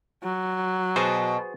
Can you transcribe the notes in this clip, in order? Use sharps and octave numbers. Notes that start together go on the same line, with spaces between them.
F#3
B2 F#4 G#4 C5